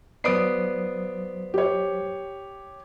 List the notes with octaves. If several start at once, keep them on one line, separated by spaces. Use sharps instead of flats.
F#3 B3 C5 D5 D#6 C7 D7
G4 C#5